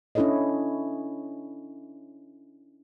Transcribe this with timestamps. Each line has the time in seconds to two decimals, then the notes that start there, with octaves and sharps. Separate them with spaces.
0.15 C#4 D4 E4 A4 C#5 D#5